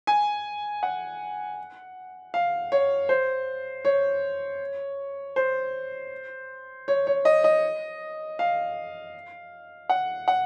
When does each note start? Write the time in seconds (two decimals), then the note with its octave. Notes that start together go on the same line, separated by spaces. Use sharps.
0.07 G#5
0.83 F#5
2.34 F5
2.72 C#5
3.09 C5
3.85 C#5
5.36 C5
6.88 C#5
7.07 C#5
7.25 D#5
7.44 D#5
8.39 F5
9.90 F#5
10.28 F#5